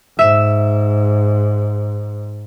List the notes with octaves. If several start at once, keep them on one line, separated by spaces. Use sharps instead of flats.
G#2 E5 E7